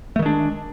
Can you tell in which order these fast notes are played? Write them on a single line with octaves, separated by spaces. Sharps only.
A3 D#3 G#3 D4